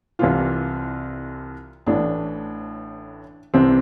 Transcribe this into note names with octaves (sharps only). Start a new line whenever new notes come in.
C2 C3 E3 F4
A1 A2 E3 D4
C2 C3 E3 C4